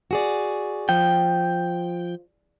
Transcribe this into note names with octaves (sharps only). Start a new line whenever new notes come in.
F#4 G#4 D5
F3 G5